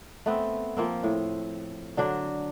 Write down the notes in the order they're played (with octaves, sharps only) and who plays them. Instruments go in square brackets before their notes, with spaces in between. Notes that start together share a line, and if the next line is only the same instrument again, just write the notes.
[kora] A3 B3 C4
F3 A#3 C4
A2
D3 F#3 D4